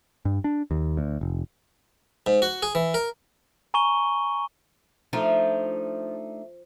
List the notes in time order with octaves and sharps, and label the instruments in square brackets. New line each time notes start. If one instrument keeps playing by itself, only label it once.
[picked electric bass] G2
D4
D#2
D2
F1
[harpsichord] G#2
F#4
G#4
E3
A#4
[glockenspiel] G#5 A#5 C#6 D#7 G7
[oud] F3 [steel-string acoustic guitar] A3 D4 D#4